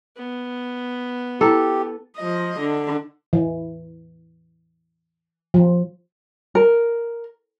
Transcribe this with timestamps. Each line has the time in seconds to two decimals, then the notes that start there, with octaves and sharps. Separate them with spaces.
0.16 B3
1.41 E4 G4 A4 A#5 D6
2.17 F3 D#5
2.60 D3
3.33 E3
5.54 F3
6.55 A#4